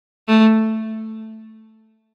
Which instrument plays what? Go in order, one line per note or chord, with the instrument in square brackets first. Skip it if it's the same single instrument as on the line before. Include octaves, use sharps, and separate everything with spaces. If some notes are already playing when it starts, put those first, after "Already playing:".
[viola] A3